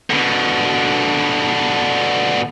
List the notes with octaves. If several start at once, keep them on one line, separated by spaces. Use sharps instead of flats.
B2 D3